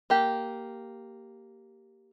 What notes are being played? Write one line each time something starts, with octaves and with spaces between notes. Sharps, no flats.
A#3 G4